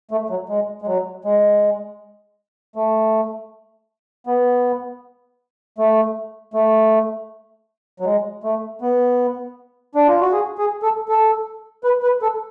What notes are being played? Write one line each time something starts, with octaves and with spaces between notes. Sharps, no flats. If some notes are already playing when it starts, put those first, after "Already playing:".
A3
F#3
G#3
G#3
F#3
G#3
A3
B3
A3
A3
F#3
G#3
A3
B3
D4
F4
F#4
G#4
G#4
A4
A4
B4
B4
A4